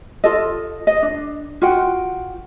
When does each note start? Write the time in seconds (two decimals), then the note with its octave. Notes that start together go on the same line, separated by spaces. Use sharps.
0.24 F4 A4 D#5
0.87 D#5
1.03 D4
1.62 F4 F#4 F#5 G5